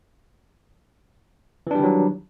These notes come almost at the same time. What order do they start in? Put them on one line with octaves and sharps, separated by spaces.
E3 D4 G3 D#3 F#3